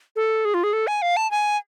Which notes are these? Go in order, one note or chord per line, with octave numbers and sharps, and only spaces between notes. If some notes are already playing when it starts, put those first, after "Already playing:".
A4
G#4
F4
G#4
A4
G#5
F5
A5
G#5